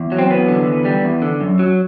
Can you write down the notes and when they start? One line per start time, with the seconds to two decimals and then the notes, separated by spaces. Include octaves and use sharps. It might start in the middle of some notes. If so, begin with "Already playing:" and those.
Already playing: E2
0.12 F#3
0.18 C4
0.30 E2 B3
0.48 D3
0.67 E2
0.85 G3
1.04 E2
1.22 D3
1.41 F#2
1.59 F#3